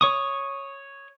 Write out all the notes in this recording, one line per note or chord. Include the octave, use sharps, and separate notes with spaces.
C#5 C#6 D#6